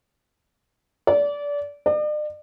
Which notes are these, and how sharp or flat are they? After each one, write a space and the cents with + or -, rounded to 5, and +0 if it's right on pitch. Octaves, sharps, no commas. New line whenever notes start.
D5 -25
D5 +45